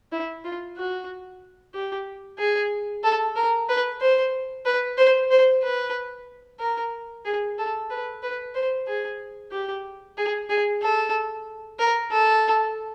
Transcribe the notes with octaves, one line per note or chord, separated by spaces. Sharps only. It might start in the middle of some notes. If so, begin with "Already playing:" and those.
E4
F4
F#4
G4
G#4
A4
A#4
B4
C5
B4
C5
C5
B4
A#4
G#4
A4
B4
B4
C5
G#4
G4
G#4
G#4
A4
A#4
A4